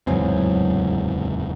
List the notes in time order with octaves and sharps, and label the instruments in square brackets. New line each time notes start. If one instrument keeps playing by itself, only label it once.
[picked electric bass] D1 G#2 C4 [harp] E2 C#3 F#3